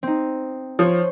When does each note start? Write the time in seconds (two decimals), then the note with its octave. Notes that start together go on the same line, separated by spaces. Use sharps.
0.03 C4 D#4
0.79 F3 C5 C#5